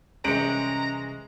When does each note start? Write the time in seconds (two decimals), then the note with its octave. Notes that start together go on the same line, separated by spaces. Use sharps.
0.25 C2 E3 G#3 C#4 A#5 C#7 D7 F#7